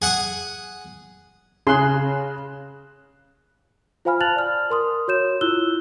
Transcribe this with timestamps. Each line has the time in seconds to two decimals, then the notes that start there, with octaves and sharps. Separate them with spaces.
0.02 G#4 F#5 G#5 D#6
1.67 C#3 G#4 C6 F#6
4.05 F4 C5 F5 G#5 B5 F6
4.21 A5 F#6 A6 F7 F#7
4.36 D5 F6
4.70 A#4 C6 D#6
5.08 F#4 C#5 G6 E7
5.41 E4 F4 E6 F#6 G7